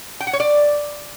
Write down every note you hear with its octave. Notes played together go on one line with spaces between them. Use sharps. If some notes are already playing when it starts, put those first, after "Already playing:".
G5
F#5
C#5
D5